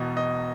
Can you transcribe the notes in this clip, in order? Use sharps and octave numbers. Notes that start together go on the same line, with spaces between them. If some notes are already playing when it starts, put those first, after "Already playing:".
Already playing: E1 E2 B2 D#5
D#5